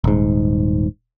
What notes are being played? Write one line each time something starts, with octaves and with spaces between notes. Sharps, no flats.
D#1 G#2